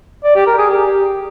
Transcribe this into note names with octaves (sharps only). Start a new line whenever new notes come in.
D5
G4
A#4
G#4
G4